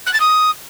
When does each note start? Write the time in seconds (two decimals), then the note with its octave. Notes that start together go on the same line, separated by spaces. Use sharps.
0.06 F#6
0.13 A6
0.20 D#6